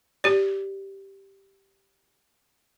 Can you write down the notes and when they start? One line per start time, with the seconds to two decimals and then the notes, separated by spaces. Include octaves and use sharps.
0.24 G4 D5